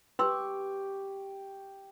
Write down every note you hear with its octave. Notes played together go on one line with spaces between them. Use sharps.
G4 B4 C6 C#6 E6